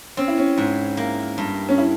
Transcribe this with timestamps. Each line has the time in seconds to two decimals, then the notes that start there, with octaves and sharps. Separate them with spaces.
0.17 C4 C#4
0.28 E4
0.38 C#4
0.58 G#2
0.97 A#3
1.38 G2
1.69 C#4
1.78 E4